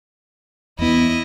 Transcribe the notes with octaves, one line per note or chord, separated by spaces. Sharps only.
E2 B3 E4 D#5